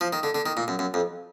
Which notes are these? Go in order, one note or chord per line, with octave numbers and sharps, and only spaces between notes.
F3
D#3
D3
D3
D#3
A#2
F#2
F#2
F2